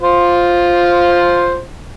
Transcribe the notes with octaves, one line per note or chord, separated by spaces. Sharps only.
F4 C5